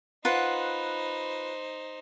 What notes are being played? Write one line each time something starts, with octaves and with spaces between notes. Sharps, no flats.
D#4 F4 B4 C5 F#5